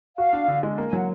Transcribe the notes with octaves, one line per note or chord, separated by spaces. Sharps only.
F#4 F5
D4
D3
G#3
A#3
G#5
F#3 F#5